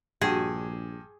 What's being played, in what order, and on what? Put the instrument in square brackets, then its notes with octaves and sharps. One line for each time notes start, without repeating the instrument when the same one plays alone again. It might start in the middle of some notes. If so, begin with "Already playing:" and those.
[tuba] A#1 [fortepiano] G2 [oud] F#4 [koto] G#4